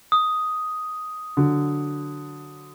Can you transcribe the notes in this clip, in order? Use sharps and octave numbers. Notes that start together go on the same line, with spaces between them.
D#6
D3 F#3